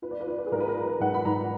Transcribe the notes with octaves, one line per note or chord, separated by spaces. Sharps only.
F4 B4
D5
B4
F4 D5
B4
G#4
G#2 A#4
B4
A#4
F4
B4
G#2 F#5
B5
G#2 A#5